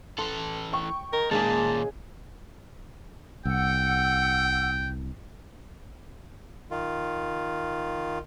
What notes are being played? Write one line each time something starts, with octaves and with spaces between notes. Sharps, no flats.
E3 A4 C6
G5 C#6
D#3 A#4
D#2 A#2 C#3 G#3 D#4 G#4 A5
C2 F#5 G5 E6
D#3 F4